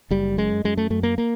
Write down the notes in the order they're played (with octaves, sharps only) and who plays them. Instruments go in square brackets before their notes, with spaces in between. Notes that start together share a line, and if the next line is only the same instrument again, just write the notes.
[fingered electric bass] F#1 G3
F#2 G#3
F#2 G#3
A3
F#2 A3
A#3
A#3